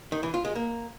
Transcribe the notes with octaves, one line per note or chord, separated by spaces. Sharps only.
D#3
E3
F4
G#3
A#3